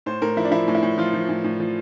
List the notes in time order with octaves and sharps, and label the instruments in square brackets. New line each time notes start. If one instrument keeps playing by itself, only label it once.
[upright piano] A2 C5
A2 A#4
F3 E4
D4
F3 E4
A2
E4
A2
F3 F4
F3
A2
A2
F3